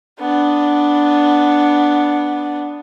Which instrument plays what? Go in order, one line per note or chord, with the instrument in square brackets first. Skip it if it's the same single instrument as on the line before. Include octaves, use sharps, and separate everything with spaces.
[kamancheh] B3 D4